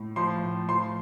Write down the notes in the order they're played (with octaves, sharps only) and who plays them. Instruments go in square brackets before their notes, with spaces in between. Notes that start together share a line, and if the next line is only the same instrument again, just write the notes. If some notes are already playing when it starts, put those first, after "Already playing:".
Already playing: [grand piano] A2
F3 C6
A2
F3 C6